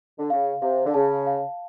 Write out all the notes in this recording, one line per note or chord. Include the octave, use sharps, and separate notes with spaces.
D3
C#3 F5
C3 F5
D3
C#3 A5
F5